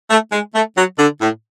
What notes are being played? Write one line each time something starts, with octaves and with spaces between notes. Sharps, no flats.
A3
G#3
A3
F#3
D3
A2